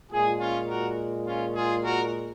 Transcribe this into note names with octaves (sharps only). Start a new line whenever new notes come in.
A#2 G#3 F4 G#4
C#4 F4
F#4 A#4
C#4 F4
F4 G#4
F#4 A#4